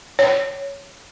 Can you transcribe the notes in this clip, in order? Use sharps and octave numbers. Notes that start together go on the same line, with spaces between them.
C#5